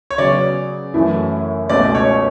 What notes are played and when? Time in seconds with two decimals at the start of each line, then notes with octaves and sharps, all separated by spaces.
0.11 C#5
0.18 C#3 F#3 B3 D5
0.94 F#2 E3 A3 C#4 E4
1.70 C#2 B2 A3 C#4 D5
1.95 C#5